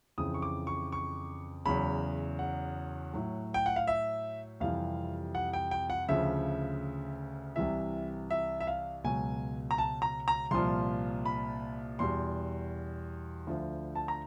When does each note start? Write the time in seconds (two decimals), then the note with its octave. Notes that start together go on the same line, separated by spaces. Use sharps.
0.18 F2 C#3 E3 D#6
0.34 C#6
0.42 D6
0.67 C#6
0.92 C#6
1.66 E2 C#3 F#3 B5
2.39 F#5
3.13 A2 F#3
3.54 G5
3.66 F#5
3.76 F5
3.87 E5
4.60 F2 C3 E3 G3 F5
5.35 F#5
5.53 G5
5.71 G5
5.90 F#5
6.08 D2 C#3 F3 E5
7.56 C2 C3 E3 E5
8.31 E5
8.60 E5
8.67 F5
9.04 C#2 B2 F#3 G#5
9.71 A#5
9.78 A5
10.02 A#5
10.28 A#5
10.51 C2 A#2 F3 C6
11.26 B5
11.99 E2 B2 G3 C6
13.47 D2 D3 F3
13.95 A5
14.08 A#5